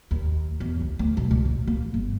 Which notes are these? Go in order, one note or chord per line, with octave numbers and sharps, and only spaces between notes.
D#2
E2
C#2
D2
B1
C#2
A#2
A#3
G1